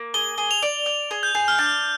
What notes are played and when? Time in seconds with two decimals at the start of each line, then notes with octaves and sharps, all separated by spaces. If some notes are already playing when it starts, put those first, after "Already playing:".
Already playing: A#3
0.14 G#4 G7
0.38 G#4
0.51 F7
0.62 D5
0.86 D5
1.11 G#4
1.23 G6
1.35 G#4
1.48 F6
1.58 D4 G6